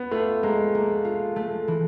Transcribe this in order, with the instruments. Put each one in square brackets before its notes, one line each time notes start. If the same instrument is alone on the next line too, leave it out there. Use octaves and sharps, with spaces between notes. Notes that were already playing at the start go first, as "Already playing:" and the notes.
Already playing: [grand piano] B3
[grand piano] A3 [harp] F4
[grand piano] G#3 [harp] A#3
[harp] A#3
F4
A3
E3